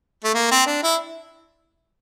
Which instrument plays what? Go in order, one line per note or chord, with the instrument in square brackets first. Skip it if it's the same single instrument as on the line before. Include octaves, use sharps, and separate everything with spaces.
[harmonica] A3
A#3
C4
D4
E4